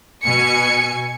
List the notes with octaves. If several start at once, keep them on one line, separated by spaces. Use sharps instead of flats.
B2 G#5 C#7